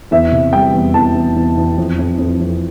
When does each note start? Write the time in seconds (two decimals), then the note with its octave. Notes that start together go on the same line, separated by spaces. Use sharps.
0.11 E2 E5
0.32 C3
0.53 G3 G5
0.74 E2
0.94 E2 A5
1.15 E2
1.36 E2
1.57 E2
1.78 F2
1.99 F2
2.18 F2
2.40 F2